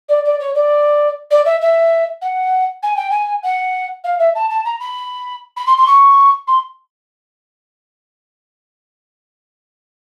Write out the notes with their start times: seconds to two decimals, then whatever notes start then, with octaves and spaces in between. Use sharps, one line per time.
0.09 D5
0.25 D5
0.40 C#5
0.55 D5
1.31 D5
1.45 E5
1.61 E5
2.22 F#5
2.83 G#5
2.96 G5
3.10 G#5
3.43 F#5
4.04 F5
4.19 E5
4.35 A5
4.50 A5
4.65 A#5
4.80 B5
5.57 B5
5.66 C6
5.77 C6
5.87 C#6
6.47 C6